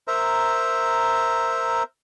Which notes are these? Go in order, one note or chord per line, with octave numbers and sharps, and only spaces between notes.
A#4 C5 E5 A#5